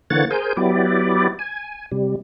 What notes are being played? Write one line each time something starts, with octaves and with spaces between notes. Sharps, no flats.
D3 E3 A#3 C#5 F#5 A6
G#4 A#4 C5 G#5 G6
F#3 B3 E4 G4 D5
G#5
C3 G3